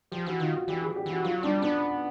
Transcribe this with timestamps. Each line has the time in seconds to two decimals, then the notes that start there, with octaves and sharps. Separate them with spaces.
0.12 F3 G4
0.26 E3 F#4
0.40 D#3 F4
0.54 F#4
0.68 E3 G4
0.82 G#4
0.96 G4
1.06 E3 F#4
1.24 F#3 F4
1.43 G3 D4
1.62 B3 D4